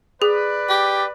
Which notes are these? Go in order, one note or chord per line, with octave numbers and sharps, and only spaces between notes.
G#4 B4 D5
G4